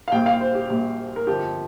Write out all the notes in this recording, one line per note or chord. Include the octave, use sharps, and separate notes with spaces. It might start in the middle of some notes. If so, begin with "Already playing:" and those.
F5
A#1 A#2 G3 G5
F5
C5
G4
A#1 A#2 G3
A#4
G1 F2 F3 G4